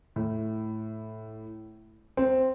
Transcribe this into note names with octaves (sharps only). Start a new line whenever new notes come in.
A2
C4